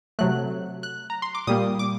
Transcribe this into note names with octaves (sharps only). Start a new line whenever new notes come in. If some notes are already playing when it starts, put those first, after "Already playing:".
C3 F#3 A3 F#6
F#6
A#5
C6
D6
A#2 G3 A#3 D#6
D6